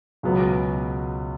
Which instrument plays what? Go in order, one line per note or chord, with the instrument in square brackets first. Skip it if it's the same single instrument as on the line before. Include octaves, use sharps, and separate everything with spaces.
[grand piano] C#2 B2 F#3 B3